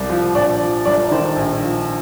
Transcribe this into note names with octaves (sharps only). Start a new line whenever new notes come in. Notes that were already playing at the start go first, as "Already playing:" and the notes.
Already playing: C2 D5
F3
A#1 D5
F3
G1 D5
D#3 C5
A#1
F3